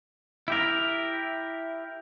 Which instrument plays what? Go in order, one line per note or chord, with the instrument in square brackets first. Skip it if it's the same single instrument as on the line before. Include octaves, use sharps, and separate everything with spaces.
[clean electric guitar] E4 G4 A#4